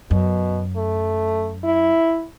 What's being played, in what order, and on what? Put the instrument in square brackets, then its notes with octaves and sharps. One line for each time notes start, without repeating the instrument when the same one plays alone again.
[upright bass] F#2 [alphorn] B2
[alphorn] A3
E4